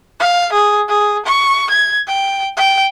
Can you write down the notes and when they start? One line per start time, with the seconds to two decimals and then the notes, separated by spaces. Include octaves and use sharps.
0.20 F5
0.52 G#4
0.88 G#4
1.25 C#6
1.70 G#6
2.07 G5
2.57 G5